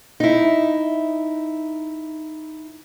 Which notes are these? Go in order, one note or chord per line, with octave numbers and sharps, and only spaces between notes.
D#4 E4